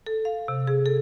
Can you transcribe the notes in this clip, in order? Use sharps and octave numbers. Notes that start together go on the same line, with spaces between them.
A4
F5
C3
G#4
A4